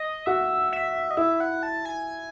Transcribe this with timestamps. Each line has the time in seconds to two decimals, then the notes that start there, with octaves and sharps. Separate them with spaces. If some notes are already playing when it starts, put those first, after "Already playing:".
Already playing: D#5
0.26 F#4 E5
0.73 E5
1.11 D#5
1.17 E4 E5
1.40 F#5
1.63 A5
1.85 G#5